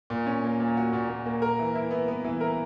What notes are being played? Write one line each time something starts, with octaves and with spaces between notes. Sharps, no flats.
A#2
C#4
A#3
A#2
F#4
A#2
A#2
A#3
A#4
E3
E4
B3
B3
E3
A#4